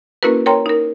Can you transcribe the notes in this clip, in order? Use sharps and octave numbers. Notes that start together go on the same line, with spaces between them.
A#3 C#4 E4 F#4 A#4 B4
A#4 C#5 G5 A#5 C6
D#4 A#4